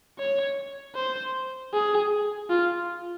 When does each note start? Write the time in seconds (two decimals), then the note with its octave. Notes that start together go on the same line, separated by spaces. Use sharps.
0.19 C#5
0.95 C5
1.73 G#4
2.50 F4